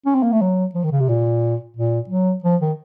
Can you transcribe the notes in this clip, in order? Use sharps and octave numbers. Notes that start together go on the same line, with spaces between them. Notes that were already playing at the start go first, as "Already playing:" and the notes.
C#4
C4
A#3
A3
F#3
F3
D#3
C#3
C3
A#2
A#2
F#3
F3
D#3